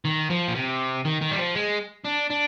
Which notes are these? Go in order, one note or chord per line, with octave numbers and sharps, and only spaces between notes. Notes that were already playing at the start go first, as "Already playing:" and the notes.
D#3
F3
A#2
C3
D#3
D#3
G3
F3
G#3
D4
D4